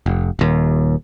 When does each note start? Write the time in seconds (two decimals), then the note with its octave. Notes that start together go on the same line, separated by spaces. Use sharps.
0.06 F1
0.39 D#1 D#2